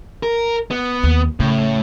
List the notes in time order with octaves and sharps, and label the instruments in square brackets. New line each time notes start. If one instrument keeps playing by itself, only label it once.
[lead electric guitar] A#4
B3
[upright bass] D#2
[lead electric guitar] A2 [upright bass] C#3